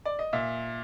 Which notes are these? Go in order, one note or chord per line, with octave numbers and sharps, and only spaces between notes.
D5
D#5
A#2 E5